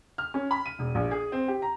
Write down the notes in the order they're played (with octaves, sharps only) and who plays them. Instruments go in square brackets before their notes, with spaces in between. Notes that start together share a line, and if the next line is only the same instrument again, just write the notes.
[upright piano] F6
C#4
B5
D#7
E1
A#1
G#4
C4
G4
A#5